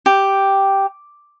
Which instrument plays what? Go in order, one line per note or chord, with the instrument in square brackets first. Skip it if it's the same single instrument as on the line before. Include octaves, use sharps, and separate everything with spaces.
[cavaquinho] G4